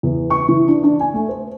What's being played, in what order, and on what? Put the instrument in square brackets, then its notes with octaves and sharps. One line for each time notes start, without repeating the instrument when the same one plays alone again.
[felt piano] E2
C#6
E3
D4
D4
G#5
A3
C5